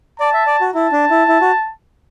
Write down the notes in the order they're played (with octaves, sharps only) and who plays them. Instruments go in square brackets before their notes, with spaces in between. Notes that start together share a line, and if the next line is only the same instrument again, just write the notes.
[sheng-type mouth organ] D5 [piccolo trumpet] A5
[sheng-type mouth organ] E5
D5
F#4
[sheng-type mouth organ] E4 [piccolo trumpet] A5
[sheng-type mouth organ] D4
E4
E4
F#4